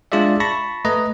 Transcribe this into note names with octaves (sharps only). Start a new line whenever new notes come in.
G#3 D4 F4 G#4 D5 E5
A5 B5 C#6 A#6
A3 B4 D#5 A#5